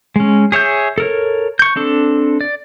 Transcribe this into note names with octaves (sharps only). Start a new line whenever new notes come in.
G#3 C#4
G#4 C#5 E5 G6
A4 A#4 C#5
C#6 G6
C4 D4 A4
D5